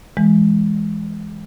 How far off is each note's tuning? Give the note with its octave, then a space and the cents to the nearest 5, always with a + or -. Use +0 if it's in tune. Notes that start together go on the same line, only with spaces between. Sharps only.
E3 +10 G#3 +0